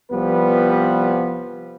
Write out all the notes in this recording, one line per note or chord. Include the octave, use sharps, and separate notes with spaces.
C2 F3 G3 B3 B4